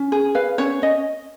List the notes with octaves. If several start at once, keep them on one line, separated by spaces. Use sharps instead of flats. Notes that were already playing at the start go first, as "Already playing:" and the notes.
Already playing: C#4
G#4
B4 F5
C#4 C#5
C#4 D#5